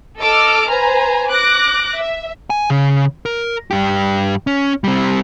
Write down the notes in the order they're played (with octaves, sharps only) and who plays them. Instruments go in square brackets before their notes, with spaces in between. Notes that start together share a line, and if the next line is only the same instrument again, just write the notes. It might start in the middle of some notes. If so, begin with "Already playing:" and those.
[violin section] A4 D#5 D6 E6 F6
B4 C5 G#5 A#5
D6 F#6 A#6
E5
[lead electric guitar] G#5
C#3
A#4
G2 G4
C#4
G3 C4